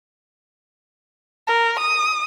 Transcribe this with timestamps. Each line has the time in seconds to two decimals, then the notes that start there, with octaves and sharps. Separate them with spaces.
1.47 A#4
1.80 D#6